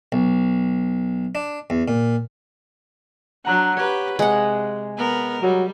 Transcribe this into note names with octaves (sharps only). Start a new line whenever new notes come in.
B1
D4
E2
A#2
F#3 D4 F#5 A#5 F#6
G4 B4 C#5
C3 G#3 F#5
B3 A#4
F#3 G3